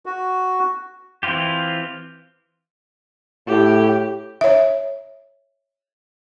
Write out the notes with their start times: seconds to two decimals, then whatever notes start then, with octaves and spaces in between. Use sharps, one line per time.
0.06 F#4
1.23 E3 C4 E4 F4 G4
3.47 A2 G4
4.41 C#5 E5